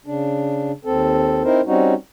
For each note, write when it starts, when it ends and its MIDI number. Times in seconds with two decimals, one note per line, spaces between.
0.06 0.72 49
0.06 0.72 62
0.85 1.42 39
0.85 1.42 60
0.85 1.42 69
1.44 1.61 60
1.44 1.61 63
1.44 1.61 64
1.44 1.61 70
1.44 1.61 72
1.66 1.94 55
1.66 1.94 60
1.66 1.94 61
1.66 1.94 63
1.66 1.94 66